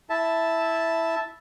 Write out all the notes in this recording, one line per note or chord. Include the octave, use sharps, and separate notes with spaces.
E4 E5 A5